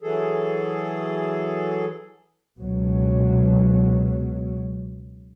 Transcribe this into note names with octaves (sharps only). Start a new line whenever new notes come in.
E3 F#3 G#4 A4
C#2 B2 F#3